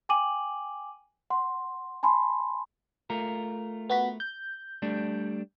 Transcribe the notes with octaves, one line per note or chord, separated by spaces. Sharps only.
G5 G#5 D6 D#7 F#7
F#5 C6
G#5 A5 B5 C6
A3 F4 A#4
B3 F#4 B5
G6
G3 A3 D4